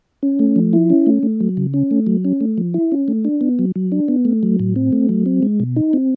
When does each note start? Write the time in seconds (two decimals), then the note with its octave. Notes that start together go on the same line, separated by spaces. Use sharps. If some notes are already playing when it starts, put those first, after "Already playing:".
0.23 C#4
0.39 A3
0.56 F3
0.73 E4
0.90 C#4
1.06 A3
1.23 A3
1.40 F#3
1.57 C#3
1.74 C#4
1.91 A3
2.07 F#3
2.25 C#4
2.41 A3
2.58 F3
2.74 E4
2.92 C#4
3.08 A3
3.25 D4
3.41 B3
3.59 F#3
3.76 F#3
3.92 D4
4.08 B3
4.25 A3
4.43 F#3
4.59 A2
4.76 C4
4.93 A3
5.09 F#3
5.26 C4
5.43 G#3
5.60 B2
5.76 D#4
5.93 C4